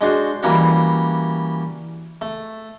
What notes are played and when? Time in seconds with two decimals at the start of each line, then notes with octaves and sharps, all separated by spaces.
0.01 G#3 D4 F#4 C5
0.43 E3 G3 A#3 C#4 F#4
2.21 A3